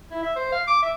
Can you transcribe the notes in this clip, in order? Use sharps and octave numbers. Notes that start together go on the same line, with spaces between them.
E4
E5
C5
F5
D6
E5